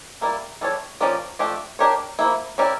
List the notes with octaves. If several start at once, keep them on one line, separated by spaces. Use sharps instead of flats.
G3 A#3 E4 A#4 D5
E3 G3 D4 A4 C#5
F3 C#4 G4 A#4 D5
F3 A3 D4 G4
D4 G4 A#4 C#5
F3 A#3 E4
C#4 E4 G4 A#4 D5